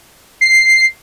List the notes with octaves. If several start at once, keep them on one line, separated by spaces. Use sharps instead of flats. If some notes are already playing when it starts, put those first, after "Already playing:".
C7